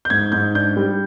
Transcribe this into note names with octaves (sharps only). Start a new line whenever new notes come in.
G6
G#2 G#6
G#2 G6
D4 G6
G3